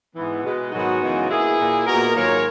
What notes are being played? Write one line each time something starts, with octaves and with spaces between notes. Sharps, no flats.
G#2 E3 B3
B2 G#3 B3
G#2 D#3 F#3 B3 D#4 F#4
F#2 C#3 E3 G#3 B3
B2 A#3 E4 G#4
A#2 A#3
A#2 G#3 B3 F#4 A#4
G#2 D#3 F#3 A#3 A#4 C#5